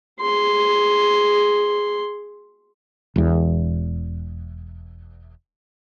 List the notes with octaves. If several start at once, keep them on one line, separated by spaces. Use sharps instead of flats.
G#4 C6
E1 E2